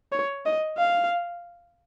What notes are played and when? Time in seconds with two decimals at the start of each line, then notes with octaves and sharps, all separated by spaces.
0.12 C#5
0.46 D#5
0.78 F5